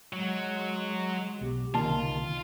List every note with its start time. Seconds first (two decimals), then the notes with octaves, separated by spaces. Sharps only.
0.13 F#3 G#3
1.41 B1 G4
1.74 C2 D3 D#3 A#3 F4 A5